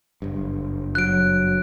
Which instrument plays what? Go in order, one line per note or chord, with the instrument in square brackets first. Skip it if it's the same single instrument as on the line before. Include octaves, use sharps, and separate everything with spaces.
[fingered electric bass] F#1 G2
[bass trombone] F#3 [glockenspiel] F#6 D7